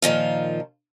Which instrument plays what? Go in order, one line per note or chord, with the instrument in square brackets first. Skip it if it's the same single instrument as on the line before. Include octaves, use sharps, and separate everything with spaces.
[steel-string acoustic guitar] A#2 D#3 F3 F4